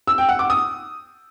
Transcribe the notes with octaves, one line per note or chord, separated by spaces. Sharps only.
E6
G5
F#5
D6
D#6